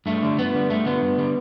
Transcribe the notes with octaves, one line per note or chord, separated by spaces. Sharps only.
G2 A3
D3 G3
G2 B3
D3 G3
G2 A3
D3 G3 B3
G2
D3 G3